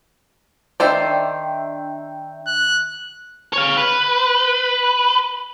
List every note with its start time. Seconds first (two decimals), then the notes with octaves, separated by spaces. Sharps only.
0.80 D#3 D4 C5 D5 E5 G5
2.47 F#6
3.53 C#5 F5
3.77 B4